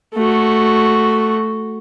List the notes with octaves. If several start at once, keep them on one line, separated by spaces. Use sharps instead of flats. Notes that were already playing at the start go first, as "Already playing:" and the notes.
A3 F#4